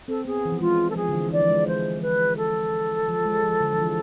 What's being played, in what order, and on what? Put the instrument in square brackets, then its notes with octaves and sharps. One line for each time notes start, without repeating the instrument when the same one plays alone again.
[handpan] C4 [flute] A4
[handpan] B3 [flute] G#4
[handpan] E3
F3
[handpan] G#3 [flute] F4
[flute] A4
[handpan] F3 [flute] G#4
[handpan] D3
E3
[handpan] E3 [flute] D5
[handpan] F3
G#3
[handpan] G#3 [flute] C5
[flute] B4
A4
[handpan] F3
G#3
F3
D3
F3
E3